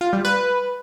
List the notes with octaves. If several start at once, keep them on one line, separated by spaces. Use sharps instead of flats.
F4
G3
B4